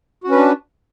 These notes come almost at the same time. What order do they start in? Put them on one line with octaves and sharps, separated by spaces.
F#4 C#4 B4 D4